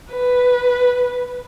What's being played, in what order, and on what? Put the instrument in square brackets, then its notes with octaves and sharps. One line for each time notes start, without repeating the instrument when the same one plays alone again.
[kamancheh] B4